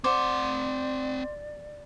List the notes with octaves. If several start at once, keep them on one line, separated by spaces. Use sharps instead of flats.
C4 C5 D5 F#5 D6